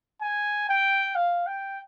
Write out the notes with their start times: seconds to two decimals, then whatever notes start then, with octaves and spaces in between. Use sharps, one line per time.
0.22 G#5
0.69 G5
1.15 F5
1.47 G5